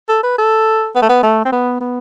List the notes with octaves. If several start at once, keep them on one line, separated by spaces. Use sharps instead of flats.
A4
B4
A4
B3
A3
B3
A3
C4
B3
B3